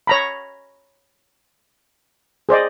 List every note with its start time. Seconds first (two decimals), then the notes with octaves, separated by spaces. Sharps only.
0.07 C#5 A#5 B5
2.49 G#4 C5 D5 D#5